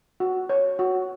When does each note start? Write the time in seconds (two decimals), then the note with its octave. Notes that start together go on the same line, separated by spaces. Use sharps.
0.20 F#4
0.50 C#5
0.79 F#4